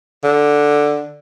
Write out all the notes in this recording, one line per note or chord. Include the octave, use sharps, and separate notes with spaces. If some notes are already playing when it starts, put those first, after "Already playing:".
D3